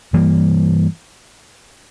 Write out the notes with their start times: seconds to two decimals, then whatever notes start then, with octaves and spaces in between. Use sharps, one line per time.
0.13 G2 E3 G3 A#3